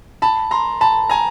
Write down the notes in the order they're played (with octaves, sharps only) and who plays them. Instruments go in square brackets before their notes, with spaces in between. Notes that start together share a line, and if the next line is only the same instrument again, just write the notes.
[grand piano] A5 B5
A#5 C6
A5 B5
G#5 A#5